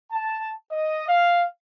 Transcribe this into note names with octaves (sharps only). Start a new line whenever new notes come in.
A5
D#5
F5